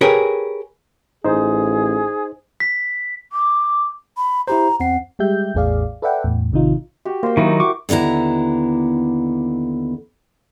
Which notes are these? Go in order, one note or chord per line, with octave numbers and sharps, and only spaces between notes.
G4 G#4 A#4 B4 C#5
A1 D#4 G#4 C5
B6
D6
B5
E4 G4 C5 A#5
E2 C4 F#5 C7
G3 G#3 G4 E5 G6
A1 E2 A2 G#4 D5 F5
A4 B4 D5 E5 F#5 G5
E2 A2
A1 C3 D#3 D#4 F4
F#4 G4
A#3 C5 G5
D#3 F#3 D#4 E4 A#4
F#4 C#6 D6
D#2 D3 B3 E4 A#5